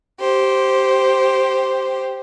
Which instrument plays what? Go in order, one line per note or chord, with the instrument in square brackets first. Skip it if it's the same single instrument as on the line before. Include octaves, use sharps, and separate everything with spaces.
[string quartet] G4 C5